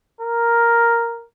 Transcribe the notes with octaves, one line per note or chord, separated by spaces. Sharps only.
A#4